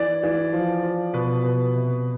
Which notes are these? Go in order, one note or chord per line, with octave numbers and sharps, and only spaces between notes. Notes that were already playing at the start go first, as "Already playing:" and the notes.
Already playing: E3 D5
E3
F3
F3
B2 B4
B2
C3